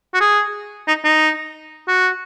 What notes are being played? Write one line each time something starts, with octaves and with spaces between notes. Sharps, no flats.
F#4
G#4
D#4
D#4
F#4